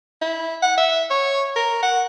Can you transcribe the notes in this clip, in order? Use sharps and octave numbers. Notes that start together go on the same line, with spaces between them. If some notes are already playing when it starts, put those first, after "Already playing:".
E4
F#5
E5
C#5
A#4
F#5